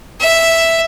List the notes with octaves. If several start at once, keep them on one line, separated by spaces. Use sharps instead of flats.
E5